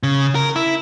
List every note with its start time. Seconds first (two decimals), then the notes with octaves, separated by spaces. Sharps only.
0.03 C#3
0.35 A#4
0.56 E4